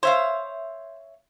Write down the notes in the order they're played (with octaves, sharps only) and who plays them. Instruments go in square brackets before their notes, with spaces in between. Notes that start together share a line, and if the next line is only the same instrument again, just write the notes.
[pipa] C5 [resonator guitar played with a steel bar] C#5 E5 F5